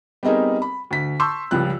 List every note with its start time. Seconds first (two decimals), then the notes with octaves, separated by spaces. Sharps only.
0.23 G3 B3 C4 D#4 G#4 A#4
0.62 B5
0.91 D2 B6
1.20 A5 C6 C#6 E6 G6
1.51 C#2 F3 G3 F#6